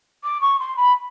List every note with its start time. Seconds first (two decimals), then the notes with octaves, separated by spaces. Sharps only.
0.23 D6
0.41 C#6
0.59 C6
0.76 B5